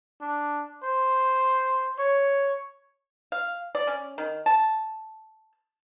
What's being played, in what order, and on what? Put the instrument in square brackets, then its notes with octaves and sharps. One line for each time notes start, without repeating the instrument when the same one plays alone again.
[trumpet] D4
C5
C#5
[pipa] F5
D5
C#4
D#3
A5